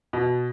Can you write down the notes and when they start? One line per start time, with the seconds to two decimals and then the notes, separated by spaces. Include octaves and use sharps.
0.13 B2